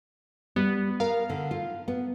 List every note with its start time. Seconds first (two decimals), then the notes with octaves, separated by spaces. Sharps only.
0.56 G3 B3
1.00 A#4 F5
1.30 D3
1.51 F4
1.88 B3